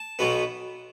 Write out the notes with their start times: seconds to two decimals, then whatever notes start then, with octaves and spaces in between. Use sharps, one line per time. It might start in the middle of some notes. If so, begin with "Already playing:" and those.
Already playing: A5
0.19 B1 B2 B3